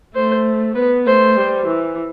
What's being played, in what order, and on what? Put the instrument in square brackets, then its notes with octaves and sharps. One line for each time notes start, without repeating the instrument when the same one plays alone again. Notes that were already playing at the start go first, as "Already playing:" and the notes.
[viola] A3 [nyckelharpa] C5
[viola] B3 [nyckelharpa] B4
[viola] A3 [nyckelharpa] C5
[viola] G3
E3